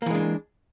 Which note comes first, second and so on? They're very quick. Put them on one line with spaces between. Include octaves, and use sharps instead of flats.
A#3 E3 G#3 D4